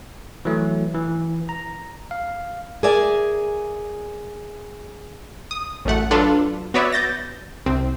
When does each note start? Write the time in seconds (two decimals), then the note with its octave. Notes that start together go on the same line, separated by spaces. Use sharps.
0.45 E3 F#3 A3
0.95 E3
1.49 A#5
2.11 F5
2.83 G#4 A#4 D5 E5 G#5
5.51 D#6
5.85 A1 F#2 A3 F#5
6.11 F#3 D4 F4 A4 B4
6.74 B3 F#4 B4 C#5 D5 E5
6.92 G6 A6 A#6
7.66 C2 C4